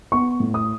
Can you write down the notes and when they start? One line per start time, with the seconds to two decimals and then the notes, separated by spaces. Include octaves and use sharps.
0.12 B3 C#6
0.40 A2
0.54 D#6